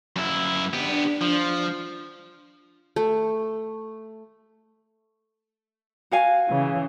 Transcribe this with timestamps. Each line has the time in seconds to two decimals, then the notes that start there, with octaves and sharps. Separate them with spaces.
0.16 F#2 E4
0.73 B3 D4 G4
1.21 F3
2.96 A3
6.11 F#4 F5 G#5
6.49 C#3 E3